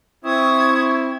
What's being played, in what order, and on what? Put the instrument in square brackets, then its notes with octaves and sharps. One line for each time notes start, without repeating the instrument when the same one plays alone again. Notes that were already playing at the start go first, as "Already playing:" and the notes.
[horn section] C4 E4 [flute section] C#6 D#6 G#6